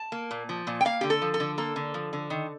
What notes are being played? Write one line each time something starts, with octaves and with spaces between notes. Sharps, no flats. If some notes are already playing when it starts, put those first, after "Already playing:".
Already playing: A5
A#3
A#2
F3
A#2
G5
A#3 F5
D3 G4
A4
F3
A4
D3
A#3 A4
D3
F3
D3
D#3